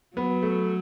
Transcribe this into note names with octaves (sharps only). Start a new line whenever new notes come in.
F#3 B3
A3